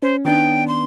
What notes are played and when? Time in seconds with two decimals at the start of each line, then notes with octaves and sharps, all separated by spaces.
0.02 C#4 C5
0.25 D#3 B3 D4 G5
0.68 C6